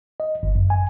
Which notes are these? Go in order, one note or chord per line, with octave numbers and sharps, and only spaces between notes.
D#5
G1
F#2
G#5